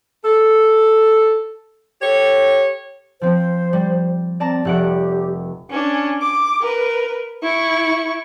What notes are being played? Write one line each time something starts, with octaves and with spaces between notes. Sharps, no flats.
A4
G4 A4 C#5
F3 C4 C5
G3
C4 D5 A5 A#5
F1 G4 F#5 D7
C#4 D4
D6
A#4 B4
E4 C#6